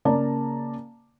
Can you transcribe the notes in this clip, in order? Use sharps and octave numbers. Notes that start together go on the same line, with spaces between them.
C#3 A#3 D5 A5 A#5